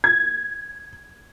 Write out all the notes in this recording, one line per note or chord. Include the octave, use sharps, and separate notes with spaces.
G#6